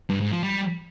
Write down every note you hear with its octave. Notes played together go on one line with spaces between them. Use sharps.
G2
G#2
F3
G3